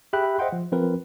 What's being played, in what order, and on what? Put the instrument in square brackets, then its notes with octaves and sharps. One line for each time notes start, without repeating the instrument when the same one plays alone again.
[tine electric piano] G4 G#4 E5 G5 B5 F#6
C5 D#5 E5 F#5 G5 C6
F3
F3 C4 F4 A#4 B4